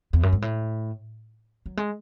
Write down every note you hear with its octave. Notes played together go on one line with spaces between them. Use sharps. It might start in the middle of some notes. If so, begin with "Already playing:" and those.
E2
F#2
G#2
A2
F#3
G#3